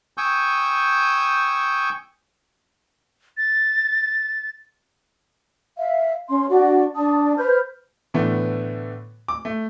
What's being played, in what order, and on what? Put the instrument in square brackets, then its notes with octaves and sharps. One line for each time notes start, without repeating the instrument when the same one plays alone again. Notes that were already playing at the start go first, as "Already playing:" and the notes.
[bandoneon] G5 G#5 C#6 D#6 E6 G6
[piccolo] A6
[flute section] E5 F5
C#4 C6
D4 F#4
D4 A5 D#6
B4 C5 F6 G6
[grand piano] A2 D3 E3 A3 B3
D6
A3